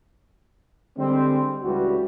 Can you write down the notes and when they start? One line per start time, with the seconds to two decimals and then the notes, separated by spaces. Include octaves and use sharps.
0.98 D3 G3 G#3 C4
1.63 C#2 E3 G3 F#4